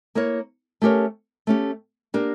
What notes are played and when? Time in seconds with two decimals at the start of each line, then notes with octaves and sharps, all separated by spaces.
0.15 A#3 E4 A#4 C#5
0.82 A3 C#4 G4 A#4 C#5
1.47 A3 C#4 G4
2.14 A#3 D4 G4 A#4